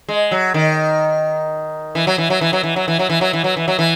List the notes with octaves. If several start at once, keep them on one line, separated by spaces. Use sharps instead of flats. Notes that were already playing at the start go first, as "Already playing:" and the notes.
G#3
F#3
D#3
E3
F#3
E3
F#3
E3
F#3
E3
F#3
E3
F#3
E3
F#3
E3
F#3
E3
F#3
E3